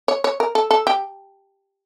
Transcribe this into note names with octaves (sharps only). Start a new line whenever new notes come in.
C#5
C#5
A#4
A4
A4
G4